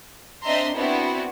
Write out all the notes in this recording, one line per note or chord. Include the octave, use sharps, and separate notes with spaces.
C4 D4 D#5 E5 A#5 C6
B3 C4 D4 E4 F#4